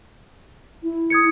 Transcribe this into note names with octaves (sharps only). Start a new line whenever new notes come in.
E4
D#6 G#6 C#7